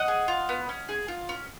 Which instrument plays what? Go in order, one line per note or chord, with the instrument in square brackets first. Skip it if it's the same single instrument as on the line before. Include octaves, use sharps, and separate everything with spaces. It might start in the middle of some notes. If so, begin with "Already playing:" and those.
Already playing: [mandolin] D#5 F#5
G#4
F4
B3
C#4
G#4
F4
C#4